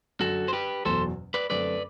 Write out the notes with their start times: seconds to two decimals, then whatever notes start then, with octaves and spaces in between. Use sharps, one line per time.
0.20 F#2 D3 F#3 F#4 A4
0.48 C5
0.53 G4 B4
0.85 F#1 E2 B2 F#3 A4 C5
1.34 B4 D5
1.50 F#2 D3 A3 C4 B4 D5